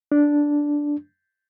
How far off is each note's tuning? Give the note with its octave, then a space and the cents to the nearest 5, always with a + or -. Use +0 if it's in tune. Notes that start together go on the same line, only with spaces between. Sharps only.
D4 -5